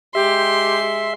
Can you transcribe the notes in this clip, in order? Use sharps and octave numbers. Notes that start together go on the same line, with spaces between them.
G#3 G4 E5 C6